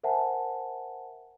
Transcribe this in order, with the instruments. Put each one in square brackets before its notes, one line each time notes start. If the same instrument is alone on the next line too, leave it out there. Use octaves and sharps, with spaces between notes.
[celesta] A#4 C5 E5 F#5 G#5 A5